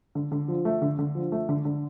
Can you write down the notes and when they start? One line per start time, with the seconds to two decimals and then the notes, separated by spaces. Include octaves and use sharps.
0.15 D3
0.32 D3
0.48 F3
0.65 A3
0.82 D3
0.99 D3
1.15 F3
1.32 A3
1.49 D3
1.65 D3